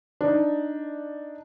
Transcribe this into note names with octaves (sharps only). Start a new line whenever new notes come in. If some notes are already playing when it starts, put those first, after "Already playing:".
D4 D#4